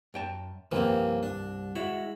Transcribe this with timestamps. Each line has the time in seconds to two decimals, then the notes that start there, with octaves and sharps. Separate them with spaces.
0.14 F#2 G5 A5
0.72 C2 G2 E3 F3 A#3 C4
1.23 D4
1.76 G#3 E4 F#4 B5